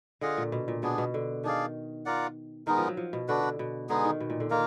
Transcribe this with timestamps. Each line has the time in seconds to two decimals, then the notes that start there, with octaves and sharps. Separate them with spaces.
0.21 D3 F4 G#4 D#5 F#5
0.37 A#2
0.52 B2
0.68 A#2
0.83 B2 B3 D4 G#4
0.98 B2
1.14 D3
1.44 D#3 D4 G#4 D5 F5
2.06 F4 A#4 D5 F#5
2.67 D#3 G#3 B3 D#4 A#4
2.78 F3
2.88 F#3
2.97 F3
3.13 B2
3.28 D3 D4 F#4 B4
3.43 B2
3.59 B2
3.89 D3 G#3 B3 D#4 G#4
4.05 D#3
4.20 B2
4.30 A#2
4.40 D3
4.51 D#3 A#3 F4 A#4